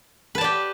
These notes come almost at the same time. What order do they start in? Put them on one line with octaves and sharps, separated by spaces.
B4 A5 D5 G4